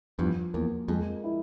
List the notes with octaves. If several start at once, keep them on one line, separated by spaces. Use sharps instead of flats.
E2 G2 F3
E2 A#3
F2 G#3
E4